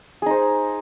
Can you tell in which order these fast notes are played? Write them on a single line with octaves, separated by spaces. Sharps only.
G#4 D#4 C5